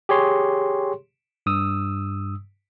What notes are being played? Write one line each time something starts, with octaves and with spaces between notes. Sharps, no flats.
G4 G#4 C#5 C6
G2 D#6 E6